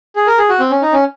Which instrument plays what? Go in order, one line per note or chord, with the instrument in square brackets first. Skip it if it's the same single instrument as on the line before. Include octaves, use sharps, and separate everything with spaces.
[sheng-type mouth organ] G#4
A#4
G#4
F#4
C4
C#4
D#4
C#4